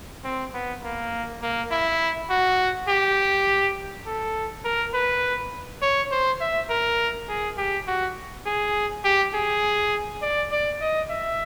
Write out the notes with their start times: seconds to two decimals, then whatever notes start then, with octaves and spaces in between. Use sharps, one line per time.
0.24 C4
0.54 B3
0.83 A#3
1.42 A#3
1.71 E4
2.30 F#4
2.89 G4
4.06 A4
4.65 A#4
4.93 B4
5.82 C#5
6.11 C5
6.41 E5
6.70 A#4
7.29 G#4
7.58 G4
7.87 F#4
8.46 G#4
9.05 G4
9.34 G#4
10.22 D5
10.51 D5
10.81 D#5
11.10 E5